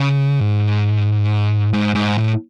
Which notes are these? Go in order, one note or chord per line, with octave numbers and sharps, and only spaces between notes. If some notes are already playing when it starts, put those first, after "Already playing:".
Already playing: C#3
G#2
G#2
G#2
A2